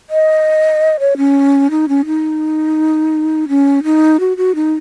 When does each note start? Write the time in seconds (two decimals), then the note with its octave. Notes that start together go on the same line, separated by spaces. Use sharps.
0.10 D#5
0.99 C#5
1.17 C#4
1.70 D#4
1.88 C#4
2.06 D#4
3.48 C#4
3.84 D#4
4.20 F#4
4.37 F#4
4.55 D#4